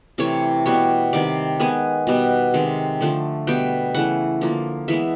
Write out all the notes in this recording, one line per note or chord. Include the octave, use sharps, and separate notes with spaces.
C3 E3 A3 C#5
B2 G3 B3 C#5
C3 D#3 G3 D5
D#3 G#3 B3 G#5
B2 G3 B3
C3 D#3 G#3
D3 F3 A3
B2 G3 B3 G5
C#3 E3 A3 F#5
D3 F3 A#3
E3 G#3 B3 E5